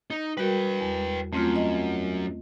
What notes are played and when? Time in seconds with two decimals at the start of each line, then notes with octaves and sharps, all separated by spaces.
0.10 D#4
0.37 G3 F#4 A#4 B4 G5
0.81 E2
1.33 F#2 A3 C4 F4
1.56 D#5